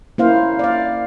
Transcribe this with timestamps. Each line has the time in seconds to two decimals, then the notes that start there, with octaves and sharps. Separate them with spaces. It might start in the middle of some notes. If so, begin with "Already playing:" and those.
0.18 A#3 C#4 E4 C5 F5
0.59 D5 F5